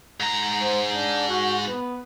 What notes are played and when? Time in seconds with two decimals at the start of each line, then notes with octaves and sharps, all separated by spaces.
0.20 G#2 A#5
0.61 C5
0.94 D4
1.28 F#4
1.68 B3